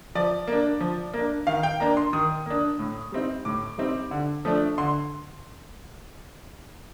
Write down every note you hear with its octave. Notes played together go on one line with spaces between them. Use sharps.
F3 D5
A#3
D4
F3
A#3
D4
D#3 F5
G5
A#3 D4 A#5
C6
D#3 D#6
A#3 D4
A2
G3 C4 D#4
A2 D6
G3 C4 D#4
D3
F3 A3 D4
D3 C6